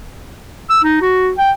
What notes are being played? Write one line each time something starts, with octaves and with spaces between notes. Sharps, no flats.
E6
D#4
F#4
G5